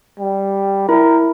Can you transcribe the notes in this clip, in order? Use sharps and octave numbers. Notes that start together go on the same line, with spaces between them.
G3
E4 A#4